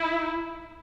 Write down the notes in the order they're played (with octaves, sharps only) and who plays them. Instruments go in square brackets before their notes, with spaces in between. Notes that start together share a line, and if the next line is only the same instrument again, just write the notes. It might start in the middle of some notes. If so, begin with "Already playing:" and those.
Already playing: [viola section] E4